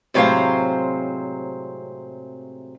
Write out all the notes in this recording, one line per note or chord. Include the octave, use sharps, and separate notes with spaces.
A2 C3 F#3 G#3 C5 F5